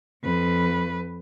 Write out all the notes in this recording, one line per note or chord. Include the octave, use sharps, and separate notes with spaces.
F2 B4